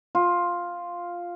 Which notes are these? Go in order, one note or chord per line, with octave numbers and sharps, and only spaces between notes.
F4